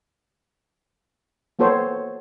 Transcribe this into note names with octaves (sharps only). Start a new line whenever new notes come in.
A#3 B3 F#4 A4 C5 C#5